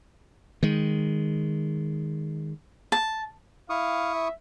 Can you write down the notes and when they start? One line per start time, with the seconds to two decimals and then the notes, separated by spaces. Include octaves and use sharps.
0.63 D#3 G#3
2.92 A5
3.70 E4 F5 C#6 D#6
4.14 E5